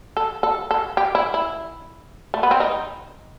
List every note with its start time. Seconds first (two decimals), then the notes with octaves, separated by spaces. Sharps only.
0.17 A4
0.43 A4
0.71 A4
0.97 G4
1.15 E4
1.34 E4
2.34 A3
2.43 B3
2.51 C4
2.60 D#4